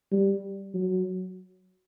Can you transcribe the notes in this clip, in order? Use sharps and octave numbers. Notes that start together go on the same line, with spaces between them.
G3
F#3